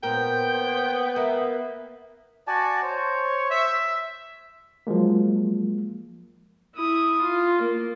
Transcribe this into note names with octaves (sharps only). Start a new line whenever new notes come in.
A#2 B3 A#4 C5 G5
A#3 E5
F#4 D5 G#5 A5
C5 C#5
E5
F3 F#3 G#3 A#3
E4 D#6
F4
A#3